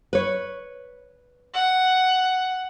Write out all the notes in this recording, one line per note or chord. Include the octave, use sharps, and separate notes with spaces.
B4 C#5
F#5